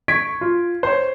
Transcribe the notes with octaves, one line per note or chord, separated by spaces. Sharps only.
C#6 G#6 B6 D7
F4
C5 C#5